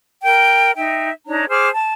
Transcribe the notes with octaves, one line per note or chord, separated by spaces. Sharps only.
A#4 G5
D#4 E5 G5
D4 D#4 C#5 A#5
G#4 C5 D6 F6
A5